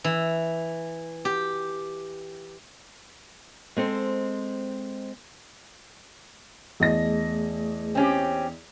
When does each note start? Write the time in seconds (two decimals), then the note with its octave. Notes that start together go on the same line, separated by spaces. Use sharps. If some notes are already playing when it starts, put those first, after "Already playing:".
0.04 E3
1.25 G4
3.77 G#3 C4 A4 C5
6.80 E2 A3 G#4 D#5 A#6
7.95 C4 C#4 G4